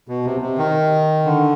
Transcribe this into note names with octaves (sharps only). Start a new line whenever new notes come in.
B2
C3
C3
D#3
D3